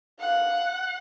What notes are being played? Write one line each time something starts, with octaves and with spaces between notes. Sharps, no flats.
F5 F#5